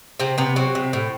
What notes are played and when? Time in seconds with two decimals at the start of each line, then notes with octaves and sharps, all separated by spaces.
0.19 C3 C4
0.38 C3 B3
0.56 F#3 C4
0.75 C3
0.93 A2